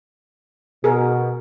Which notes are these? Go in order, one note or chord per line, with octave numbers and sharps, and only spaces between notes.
B2 G#4 A#4